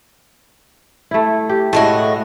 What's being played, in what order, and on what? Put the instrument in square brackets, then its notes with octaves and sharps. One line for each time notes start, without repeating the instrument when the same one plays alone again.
[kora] A3 E4
G4
[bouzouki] A2 G#3 F#4 [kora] A3